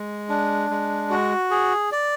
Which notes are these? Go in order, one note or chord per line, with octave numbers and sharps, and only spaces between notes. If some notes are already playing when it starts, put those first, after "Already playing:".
Already playing: G#3
D4
G#3
F#4
G#4
D5